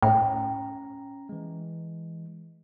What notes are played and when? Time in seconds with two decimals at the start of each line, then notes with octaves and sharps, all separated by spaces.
0.02 A2 C#4 G5 A#5
1.29 E3 G#3